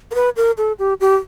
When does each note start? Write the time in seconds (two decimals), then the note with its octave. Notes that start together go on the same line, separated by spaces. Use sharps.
0.11 A#4
0.15 B4
0.36 A#4
0.58 A4
0.79 G4
1.00 G4